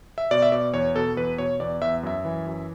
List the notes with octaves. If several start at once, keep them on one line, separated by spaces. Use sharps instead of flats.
E5
B2 D5
E5
B2 D5
E2 C#5
B2 A4
E2 B4
B2 C#5
E2 D5
E2 E5
F#2 E5
E3
F#2